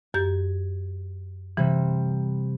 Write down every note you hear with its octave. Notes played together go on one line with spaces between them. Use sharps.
F#2 G4 G6 G#6
C3 E3 G3